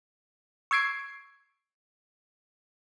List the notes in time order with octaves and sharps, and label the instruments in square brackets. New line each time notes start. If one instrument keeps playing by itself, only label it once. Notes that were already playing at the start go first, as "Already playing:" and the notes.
[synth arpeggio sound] C#6 E6 G#6 C7 D7